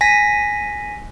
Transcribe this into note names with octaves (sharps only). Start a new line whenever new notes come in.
G#5 A#6 B6